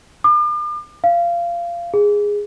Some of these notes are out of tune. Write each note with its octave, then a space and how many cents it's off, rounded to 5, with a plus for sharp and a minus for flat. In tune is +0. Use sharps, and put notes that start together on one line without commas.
D6 +45
F5 -20
G#4 -10